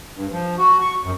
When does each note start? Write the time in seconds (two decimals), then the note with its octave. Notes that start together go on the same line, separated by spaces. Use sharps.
0.16 G2
0.32 F3
0.58 F#4
0.81 C#6
1.03 F#2